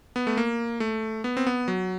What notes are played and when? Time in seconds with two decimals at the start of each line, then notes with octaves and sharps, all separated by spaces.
0.16 B3
0.27 A3
0.37 A#3
0.80 A3
1.24 B3
1.37 C4
1.47 B3
1.68 F#3